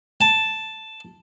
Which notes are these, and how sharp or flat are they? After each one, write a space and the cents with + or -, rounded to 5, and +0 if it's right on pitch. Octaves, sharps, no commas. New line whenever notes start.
A5 +0